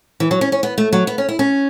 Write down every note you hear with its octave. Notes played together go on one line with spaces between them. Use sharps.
E3
F#3
C#4
C#4
B3
A3
F#3
B3
C#4
E4
C#4